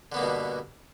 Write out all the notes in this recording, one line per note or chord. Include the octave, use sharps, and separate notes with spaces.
G2 B2 D3 A#3 B3